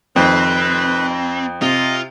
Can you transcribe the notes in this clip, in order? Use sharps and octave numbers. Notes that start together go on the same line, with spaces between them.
F1 F2 D#3 C4 B4
C3 F4 D#5